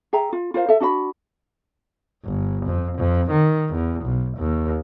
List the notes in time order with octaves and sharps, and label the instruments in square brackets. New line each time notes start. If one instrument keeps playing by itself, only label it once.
[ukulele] G#4 E5 G5 A#5
F4
F4 A#4 C5 F5
A4 E5
D4 F#4 D#5 B5
[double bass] G1
F2
F2
D#3
E2
B1
D#2